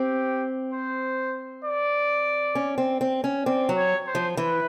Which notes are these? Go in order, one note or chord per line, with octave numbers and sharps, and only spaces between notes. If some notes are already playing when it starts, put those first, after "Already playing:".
Already playing: C4 G4
C5
D5
C#4
C4
C4
C#4
C4 D5
F#3
C#5
C5
F3
E3 B4